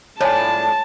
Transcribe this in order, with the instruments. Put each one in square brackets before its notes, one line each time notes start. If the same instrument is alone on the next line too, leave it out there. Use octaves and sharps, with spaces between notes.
[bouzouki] A2 F3 D4 [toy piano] C#5 G#5 [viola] A5